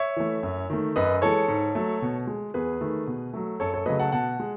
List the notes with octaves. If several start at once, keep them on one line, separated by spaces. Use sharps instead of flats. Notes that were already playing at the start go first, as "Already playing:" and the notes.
Already playing: C#5 E5
E3 A3
F#2
D#3 A3
F#2 B4 D#5
E3 G#3 A4 C#5
G#2
F#3 A3
B2
G#3
E2 G#4 B4
D#3 A3
B2
F#3 A3
F#2 A4 C#5
A4 C#5
C#3 F#3 A3 B4 D#5
F#5 A5
B2 F#5 A5
G#3